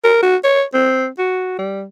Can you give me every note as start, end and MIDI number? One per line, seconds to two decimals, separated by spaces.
0.04 0.20 70
0.23 0.36 66
0.44 0.64 73
0.74 1.08 60
1.18 1.54 66
1.59 1.85 55